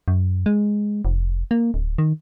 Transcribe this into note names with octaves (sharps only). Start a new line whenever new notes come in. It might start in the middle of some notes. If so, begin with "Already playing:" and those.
F#2
G#3
F1
A#3
D1
D#3